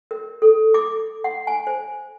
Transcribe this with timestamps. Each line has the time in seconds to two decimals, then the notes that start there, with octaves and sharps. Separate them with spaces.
0.11 A#4
0.42 A4
0.74 D6
1.24 F#5
1.47 G#5
1.67 C5